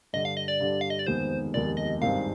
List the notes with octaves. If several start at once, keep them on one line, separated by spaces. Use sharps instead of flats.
G2 D3 G3 D#5
F5
D#5
D5
G2 D3 G3
F5
D#5
D5
F1 D#2 D#3 G#3 B3 C5
F1 D#2 D#3 G#3 B3 D5
D#5
G#1 G2 D#3 G#3 C4 F5